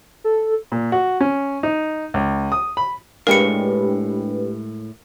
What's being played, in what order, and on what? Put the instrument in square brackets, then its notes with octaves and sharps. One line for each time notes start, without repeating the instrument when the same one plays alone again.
[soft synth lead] A4
[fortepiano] A#2
F#4
C#4
D#4
C#2
D#6
B5
[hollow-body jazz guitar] A2 G#3 F5 [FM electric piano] D4 G4 B4 [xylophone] A#4 C#7